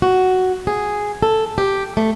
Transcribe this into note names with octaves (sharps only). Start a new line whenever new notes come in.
F#4
G#4
A4
G4
A3